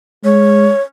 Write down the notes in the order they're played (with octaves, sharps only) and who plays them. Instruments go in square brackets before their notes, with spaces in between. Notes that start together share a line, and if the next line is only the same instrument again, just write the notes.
[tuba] G#3 [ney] C#5